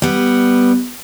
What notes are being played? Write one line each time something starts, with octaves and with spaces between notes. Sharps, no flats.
G3 B3